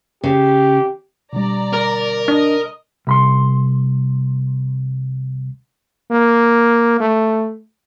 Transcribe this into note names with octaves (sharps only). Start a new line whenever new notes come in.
C#3 G4
B2 D3 G3 D5 A#5
A#4
D4 D#5
C2 B5 C6
A#3
A3